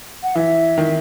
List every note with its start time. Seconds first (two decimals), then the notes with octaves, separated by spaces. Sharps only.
0.23 F#5
0.35 E3 E5
0.78 D#3